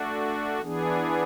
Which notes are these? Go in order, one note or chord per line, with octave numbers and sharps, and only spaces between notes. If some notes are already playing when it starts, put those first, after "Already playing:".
Already playing: A3 D4 F#4
E3 B3 D4 G#4